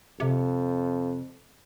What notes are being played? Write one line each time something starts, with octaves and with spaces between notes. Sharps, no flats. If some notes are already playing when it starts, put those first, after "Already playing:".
F2 C3